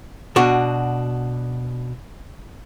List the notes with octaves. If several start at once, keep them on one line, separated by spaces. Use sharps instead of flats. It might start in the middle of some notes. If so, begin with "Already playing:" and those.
B2 D4 F#4